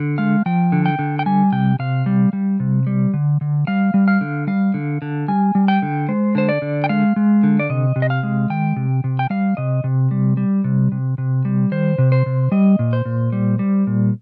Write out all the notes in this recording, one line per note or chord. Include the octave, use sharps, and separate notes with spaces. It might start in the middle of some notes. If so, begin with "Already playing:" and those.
Already playing: D3
G#3 F5
F3 G5
D3
G5
D3
G5
G3 G#5
C3 G5
C3 F5
G3
G3
C3
G3
D3
D3
G3 F5
G3
F5
D3
G3 F5
D3
D3
G3 G#5
G3
G5
D3
G#3 C5
D3 C5
D5
D3
G5
G#3 F5
G#3
D3
D5
C3 D#5
C3
D#5
F5
G#3
D#3 G5
C3
C3
G5
G3 F5
C3 D#5
C3
G3
G3
C3
C3
C3
G3
D#3 C5
C3
C5
C3
G3 D#5
A#2
C5
A#2
G3
G3
A#2